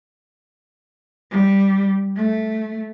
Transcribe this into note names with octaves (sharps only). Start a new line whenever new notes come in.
G3
A3